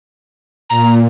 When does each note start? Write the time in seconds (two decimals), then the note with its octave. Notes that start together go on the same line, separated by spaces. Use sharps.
0.70 A#2 A#5